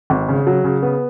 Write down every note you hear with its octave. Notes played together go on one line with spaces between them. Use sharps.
G#1
C#3
F#3
C#3
B3